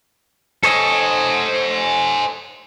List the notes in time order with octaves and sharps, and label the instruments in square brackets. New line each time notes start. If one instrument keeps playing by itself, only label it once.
[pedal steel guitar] A4 C#5 D#5 [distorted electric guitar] C5 G#5